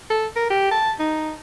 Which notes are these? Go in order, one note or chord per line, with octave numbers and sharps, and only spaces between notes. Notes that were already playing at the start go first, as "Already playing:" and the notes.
A4
A#4
G4
A5
D#4